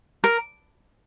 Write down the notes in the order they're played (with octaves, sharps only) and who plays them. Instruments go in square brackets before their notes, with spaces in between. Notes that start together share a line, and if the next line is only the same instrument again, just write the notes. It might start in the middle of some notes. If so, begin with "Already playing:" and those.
[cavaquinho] A#4